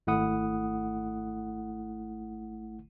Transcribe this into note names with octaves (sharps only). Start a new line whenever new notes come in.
G#1 A3 E4 F#5 D#6